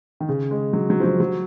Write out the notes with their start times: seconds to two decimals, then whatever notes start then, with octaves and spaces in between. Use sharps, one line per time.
0.20 D#3
0.29 C#3
0.51 G#3
0.73 F#3
0.90 F#3
1.00 F3
1.04 F#3
1.20 F#3